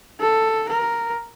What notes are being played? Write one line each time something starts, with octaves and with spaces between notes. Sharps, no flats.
A4
A#4